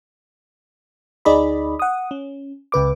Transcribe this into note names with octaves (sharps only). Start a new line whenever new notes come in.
D2 D#4 G#4 D5 D#5 B5
F#5 D#6
C#4
C#2 C#3 B4 D6